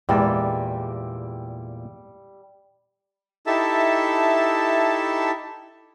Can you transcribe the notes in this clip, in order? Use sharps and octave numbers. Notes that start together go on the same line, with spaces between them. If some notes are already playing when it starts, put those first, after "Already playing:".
E2 A#2 G3 G#3 A#3 G5 A5 E6
D#4 E4 G4 A4 E5 A5